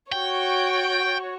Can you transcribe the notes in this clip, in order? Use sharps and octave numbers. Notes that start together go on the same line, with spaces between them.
F#4 C#5 G5